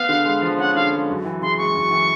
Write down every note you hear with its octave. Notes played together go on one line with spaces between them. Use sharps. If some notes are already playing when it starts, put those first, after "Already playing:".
Already playing: B3 F5
D3
G#3
F3
C#4 F#5
D3 F5
G#3
F#2
E3
C#3 C6
G#3 C#6
F#2
E3